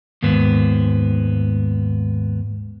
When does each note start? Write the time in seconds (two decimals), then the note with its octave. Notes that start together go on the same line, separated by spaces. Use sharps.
0.23 D#2 G#2 A#3 B3